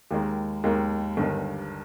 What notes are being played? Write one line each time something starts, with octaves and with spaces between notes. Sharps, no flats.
D#2 D#3 G#3
D#2 D#3 G#3
G1 G2 D#3